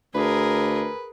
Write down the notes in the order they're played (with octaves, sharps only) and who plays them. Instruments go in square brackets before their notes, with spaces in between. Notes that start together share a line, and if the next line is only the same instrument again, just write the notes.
[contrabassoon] D2 [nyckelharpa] G#4 A#4 [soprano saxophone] B4